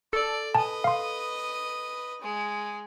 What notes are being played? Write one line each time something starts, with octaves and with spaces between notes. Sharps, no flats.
A4 D5
B4 D#5 G#5 A5
F5 C6
G#3